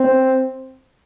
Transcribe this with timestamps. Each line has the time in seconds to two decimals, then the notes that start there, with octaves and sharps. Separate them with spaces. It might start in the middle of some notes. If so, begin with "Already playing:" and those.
Already playing: C4